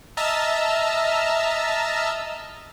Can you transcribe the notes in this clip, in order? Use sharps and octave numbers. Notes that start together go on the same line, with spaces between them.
D#5 E5 A5 A#5 E6 F6